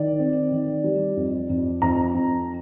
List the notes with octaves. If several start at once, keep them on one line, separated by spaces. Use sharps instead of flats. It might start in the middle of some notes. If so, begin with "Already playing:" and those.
Already playing: D#3 D5
C4
D#3
G3
F2
F2
F2 A#5
F2